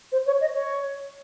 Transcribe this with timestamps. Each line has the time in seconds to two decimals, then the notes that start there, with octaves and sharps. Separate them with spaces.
0.12 C5
0.26 C#5
0.41 D#5
0.54 C#5